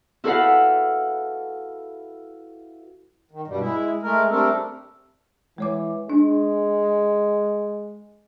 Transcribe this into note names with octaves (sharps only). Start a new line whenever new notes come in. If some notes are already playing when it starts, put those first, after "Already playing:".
E4 F#4 A4 B4 F5 F#5
D#3
G2 B2 G3
G#3 E4
G#3 A3 A#4
G3 A3 C4 D4 A4 A#4
E3 G#3 C#5 D6
G#3 D4